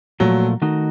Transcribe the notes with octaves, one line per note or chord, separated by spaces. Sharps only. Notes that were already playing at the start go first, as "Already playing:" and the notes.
A#2 F3 F#3 A3
D#3 A3 D#4 F#4